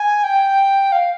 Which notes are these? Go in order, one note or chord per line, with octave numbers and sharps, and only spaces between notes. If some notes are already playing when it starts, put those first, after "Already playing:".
Already playing: G#5
G5
F5